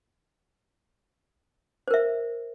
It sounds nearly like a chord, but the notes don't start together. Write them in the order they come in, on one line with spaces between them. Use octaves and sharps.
C5 A#4 E5